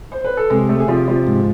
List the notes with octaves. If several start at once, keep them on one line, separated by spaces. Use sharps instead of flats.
C5
B4
A4
C3 G#3 G#4
A3 A4
G#4
C3 F3 F4
F3 F4
G#2